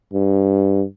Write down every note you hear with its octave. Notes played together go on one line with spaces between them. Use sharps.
G2